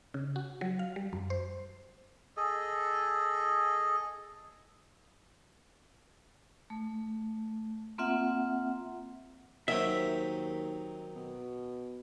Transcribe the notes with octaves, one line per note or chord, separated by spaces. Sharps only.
C#3
F#4
F#3
F5
G3
F#2
C5
G#4 A4 D#5
A3
A#3 C4 F4 E5 F#5
D#2 D#3 F#3 C4 E5
B2